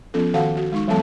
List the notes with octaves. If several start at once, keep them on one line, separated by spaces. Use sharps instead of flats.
F3 B3 C#4 F4 A4
D#3 F#4 A4 F5 F#5 A5
F#4
G#3 D#4 C#6
E3 F#3 G#3 B3 A4 A5